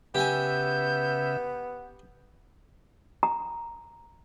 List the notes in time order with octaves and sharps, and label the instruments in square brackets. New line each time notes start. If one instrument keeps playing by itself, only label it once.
[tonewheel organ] C#3 E5 [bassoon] B3 [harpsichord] G4 G5 G#5 [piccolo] G6
[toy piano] A#5